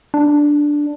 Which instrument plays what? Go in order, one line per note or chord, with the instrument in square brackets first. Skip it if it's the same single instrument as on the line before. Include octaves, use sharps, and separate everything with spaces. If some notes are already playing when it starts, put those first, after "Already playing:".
[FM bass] D4